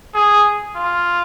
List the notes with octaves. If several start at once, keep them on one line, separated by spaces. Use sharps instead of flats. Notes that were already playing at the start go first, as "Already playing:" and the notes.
G#4
F4